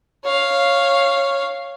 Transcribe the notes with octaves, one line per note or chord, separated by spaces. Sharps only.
C#5 F5